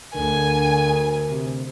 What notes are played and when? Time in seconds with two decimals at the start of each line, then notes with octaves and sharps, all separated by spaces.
0.15 D2 D3 A#4 G#5
1.30 C3